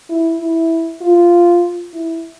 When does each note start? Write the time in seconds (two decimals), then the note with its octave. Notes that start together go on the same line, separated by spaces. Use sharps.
0.09 E4
0.40 E4
1.01 F4
1.93 E4